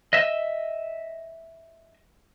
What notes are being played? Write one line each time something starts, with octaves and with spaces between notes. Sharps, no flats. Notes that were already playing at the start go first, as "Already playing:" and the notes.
D#5 E5